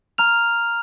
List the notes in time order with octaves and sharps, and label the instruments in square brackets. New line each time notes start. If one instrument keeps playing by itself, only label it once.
[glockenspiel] A#5 F6 F7